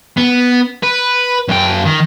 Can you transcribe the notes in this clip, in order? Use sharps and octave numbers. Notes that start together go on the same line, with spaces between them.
B3
B4
F#2 G5
D#3